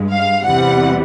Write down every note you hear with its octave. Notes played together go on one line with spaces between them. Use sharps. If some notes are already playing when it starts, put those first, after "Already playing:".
Already playing: G2 G#3
F5
E2 C3 E3 G3 F#5